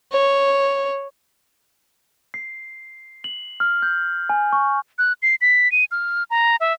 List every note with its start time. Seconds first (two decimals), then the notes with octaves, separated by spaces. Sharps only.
0.12 C#5
2.34 C7
3.24 F#7
3.60 F6
3.82 G6
4.29 G#5
4.53 C#6
4.98 F#6
5.22 C7
5.41 B6
5.72 D#7
5.91 F6
6.30 A#5
6.60 E5